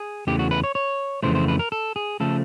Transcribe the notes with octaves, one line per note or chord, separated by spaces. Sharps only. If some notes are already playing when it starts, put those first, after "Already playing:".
Already playing: G#4
E2 C#3 E3 A3 G4
F#4
B4
C#5
C#5
F2 C#3 E3 A3 C5
C5
B4
A#4
A4
G#4
C#3 F3 A3 A4